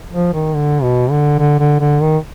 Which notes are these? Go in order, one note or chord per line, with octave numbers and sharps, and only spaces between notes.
F3
D#3
D3
B2
D3
D3
D3
D3
D#3